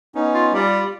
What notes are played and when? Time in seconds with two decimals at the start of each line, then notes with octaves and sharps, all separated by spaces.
0.15 B3 C#4 D#4
0.34 F4
0.53 G3 F4 D5